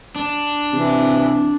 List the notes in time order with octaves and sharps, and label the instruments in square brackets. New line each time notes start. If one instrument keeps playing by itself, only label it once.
[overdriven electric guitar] D4
[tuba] C3 [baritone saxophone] E3